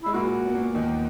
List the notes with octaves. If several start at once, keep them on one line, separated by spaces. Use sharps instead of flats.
G#3 E4
A#2 A#3 F#4
B3
A#2 A#3
D#2 D#3